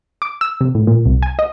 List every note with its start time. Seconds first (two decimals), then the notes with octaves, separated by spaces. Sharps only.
0.22 D6
0.41 E6
0.61 C3
0.75 A2
0.87 A#2
1.05 C2
1.23 G#5
1.39 D#5